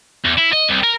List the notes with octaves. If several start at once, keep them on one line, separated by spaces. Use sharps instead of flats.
E2
E4
D#5
C2
A#4